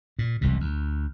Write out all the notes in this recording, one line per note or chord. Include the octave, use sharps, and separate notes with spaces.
A#2
E1 C2 F2 C3
D2